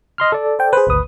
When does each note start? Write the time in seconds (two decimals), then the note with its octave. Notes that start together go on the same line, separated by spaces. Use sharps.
0.18 D#5 C6 F6
0.32 A4 D5
0.59 C5 G5
0.73 G#4 B4 C5
0.87 G#1 D2 D#6